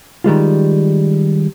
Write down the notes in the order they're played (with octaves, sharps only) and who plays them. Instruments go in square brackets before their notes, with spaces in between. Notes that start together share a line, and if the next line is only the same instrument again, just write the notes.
[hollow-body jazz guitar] D#3 G3 G#3 F4